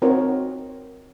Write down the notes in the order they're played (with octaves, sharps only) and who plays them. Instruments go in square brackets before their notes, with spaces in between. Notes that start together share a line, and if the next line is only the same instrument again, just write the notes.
[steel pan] C4 D#4 F#4 A#4 C#5